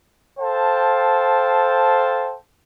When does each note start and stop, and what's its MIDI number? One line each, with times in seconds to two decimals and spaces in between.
0.40 2.34 69
0.40 2.34 72
0.40 2.34 77
0.40 2.34 79
0.40 2.34 81